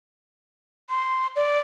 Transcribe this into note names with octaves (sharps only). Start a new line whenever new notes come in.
C6
D5